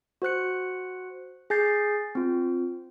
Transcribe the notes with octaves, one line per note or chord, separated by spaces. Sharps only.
F#4 C5 F#6 C#7
G#4 G#5 D6 G6 A6 C7
C4 F4